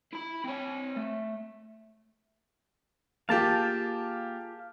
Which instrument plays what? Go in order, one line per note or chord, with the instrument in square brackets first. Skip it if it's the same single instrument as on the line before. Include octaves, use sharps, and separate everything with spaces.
[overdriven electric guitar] E4 B5
C4 C#5
A3
[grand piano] A#3 G4 [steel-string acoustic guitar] F4 G#4 [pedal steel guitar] F5 A5